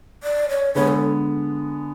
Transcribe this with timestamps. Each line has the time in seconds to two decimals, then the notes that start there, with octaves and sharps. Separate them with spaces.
0.23 D5
0.49 C#5
0.74 D3 G#3 B3 C#5
0.88 A4